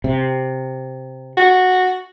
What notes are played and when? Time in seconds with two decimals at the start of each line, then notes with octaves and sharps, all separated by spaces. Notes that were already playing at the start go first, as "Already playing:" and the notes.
0.04 C3
1.37 F#4